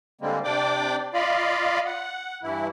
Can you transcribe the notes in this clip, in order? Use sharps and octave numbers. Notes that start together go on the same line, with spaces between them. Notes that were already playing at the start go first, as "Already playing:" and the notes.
D3 G3 G#3 A#3 C4
C3 D4 D5 G5 D6
F4 D5 D#5 F5 B5
F#5
G2 E3 E4